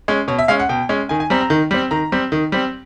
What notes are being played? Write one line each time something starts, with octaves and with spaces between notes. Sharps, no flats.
G#3 C#4
B2 C#5
E5
G#3 C#4 F5
F#5
B2 G5
G#3 C#4
D#3 G#5
G#5
G3 C4 A#5
A#5
D#3
G3 C4
D#3 A#5
G3 C4
D#3
G3 C4